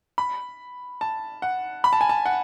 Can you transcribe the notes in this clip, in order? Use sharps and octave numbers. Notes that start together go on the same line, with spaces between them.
B5
A5
F#5
B5
A5
G#5
A5
F#5